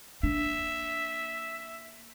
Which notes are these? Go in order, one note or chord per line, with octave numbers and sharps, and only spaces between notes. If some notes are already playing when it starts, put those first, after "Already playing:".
A#3 D4 E5